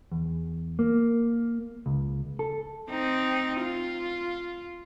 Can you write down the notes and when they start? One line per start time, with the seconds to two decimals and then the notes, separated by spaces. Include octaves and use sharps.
0.12 E2
0.79 A#3
1.86 C#2
2.39 A4
2.90 C4 D#4
3.61 F4